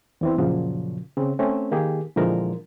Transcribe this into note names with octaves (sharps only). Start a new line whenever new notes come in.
E2 E3 C4
F#2 A#2 C#3 F3 F#3
C#3 C4
A3 C4 C#4
D#3 A#3 G4 G#4
A#2 D3 E3 F3 G#3 A#4